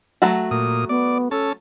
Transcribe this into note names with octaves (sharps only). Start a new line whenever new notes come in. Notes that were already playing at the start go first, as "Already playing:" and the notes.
F#3 A3 F#4
A#2 D#6
B3 D5
C#4 A4 A5